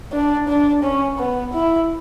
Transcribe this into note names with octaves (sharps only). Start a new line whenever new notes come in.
D4
D4
C#4
B3
E4